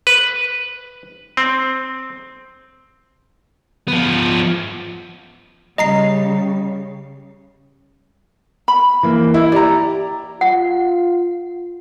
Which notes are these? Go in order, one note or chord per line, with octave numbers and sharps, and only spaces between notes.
B4
C4
F3 B3
C#3 G3 D#5 A#5 C7
B5
E3 A#3
E4
G4 D5 A#5
F4 F#5